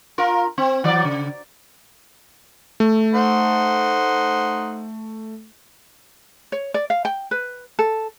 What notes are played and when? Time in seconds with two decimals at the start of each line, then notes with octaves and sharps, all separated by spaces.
0.18 F4 A#4
0.58 C4
0.84 E3 F#3 D5
1.04 C#3
2.80 A3
3.14 D#4 C5 F#5
6.52 C#5
6.74 D5
6.90 F5
7.05 G5
7.31 B4
7.79 A4